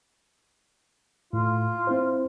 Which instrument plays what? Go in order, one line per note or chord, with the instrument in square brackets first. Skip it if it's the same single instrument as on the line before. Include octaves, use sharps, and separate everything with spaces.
[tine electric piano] A2 [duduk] F4
[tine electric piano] C4 E4 C5